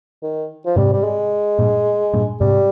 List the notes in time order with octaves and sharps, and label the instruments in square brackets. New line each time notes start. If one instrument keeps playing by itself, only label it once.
[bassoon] D#3
F3
[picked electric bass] G#2 C3 [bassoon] G3
[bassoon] G3
G#3
[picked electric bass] G2 A#2
G2 A#2
[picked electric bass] G#2 C3 [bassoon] G3